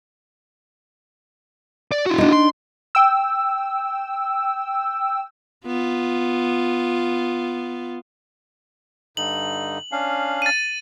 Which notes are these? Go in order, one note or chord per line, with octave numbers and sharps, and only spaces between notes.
D5
E4 F#4
D4 D#4
C6
G5 E6
B3 F4
G2 D3 D#4 F#7
C#4 D4 F5
A6 D#7